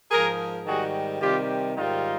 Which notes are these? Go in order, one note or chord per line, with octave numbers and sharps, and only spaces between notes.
G#2 F3 G#4 A#4
G#2 D#3 G3 F#4 G#4
C3 D#3 G3 F4 G4
G#2 D#3 G3 D#4 F4